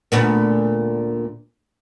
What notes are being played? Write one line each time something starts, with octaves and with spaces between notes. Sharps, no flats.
D2 A#2 B3